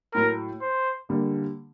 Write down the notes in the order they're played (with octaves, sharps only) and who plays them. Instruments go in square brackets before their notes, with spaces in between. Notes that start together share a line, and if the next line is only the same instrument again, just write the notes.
[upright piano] A2 F#3 A3 [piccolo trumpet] A#4
[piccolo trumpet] C5
[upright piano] D3 G3 A#3